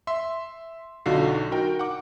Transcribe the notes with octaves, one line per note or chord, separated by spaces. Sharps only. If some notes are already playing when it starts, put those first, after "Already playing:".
E5 C6
B1 D3 D#4 F4 F#4 C7
D#4 F#4 A#4 G5
F#5 D6